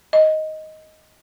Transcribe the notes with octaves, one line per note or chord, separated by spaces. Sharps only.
D#5